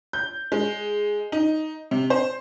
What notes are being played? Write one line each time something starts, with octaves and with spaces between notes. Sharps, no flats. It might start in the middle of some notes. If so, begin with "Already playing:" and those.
G6
G#3
D#4
C3
C5